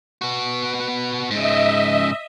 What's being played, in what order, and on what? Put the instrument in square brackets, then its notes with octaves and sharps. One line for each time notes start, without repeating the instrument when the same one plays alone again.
[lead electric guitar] B3 F#4
[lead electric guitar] G#2 C#3 [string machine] D#5 E5